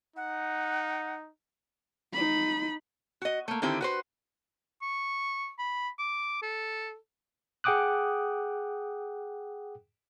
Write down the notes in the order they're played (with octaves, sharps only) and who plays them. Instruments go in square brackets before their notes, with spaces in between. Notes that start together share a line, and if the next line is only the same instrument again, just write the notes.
[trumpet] D#4 [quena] F#5
[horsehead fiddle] D#4 B5
[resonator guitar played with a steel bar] F#4 D#5
A3 A#3
D3 D#3 C4 E4 G4
F#4 B4 C5
[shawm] C#6
B5
D6
A4
[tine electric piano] G#4 F#5 G5 D6 D#6 F#6